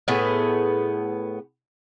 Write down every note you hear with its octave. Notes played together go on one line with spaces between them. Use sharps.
A2 B3 G#4